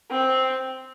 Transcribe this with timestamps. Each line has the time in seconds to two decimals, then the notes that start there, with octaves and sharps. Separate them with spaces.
0.11 C4